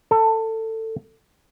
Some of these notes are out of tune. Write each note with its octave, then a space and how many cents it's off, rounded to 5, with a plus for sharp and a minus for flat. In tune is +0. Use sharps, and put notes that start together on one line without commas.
A4 +20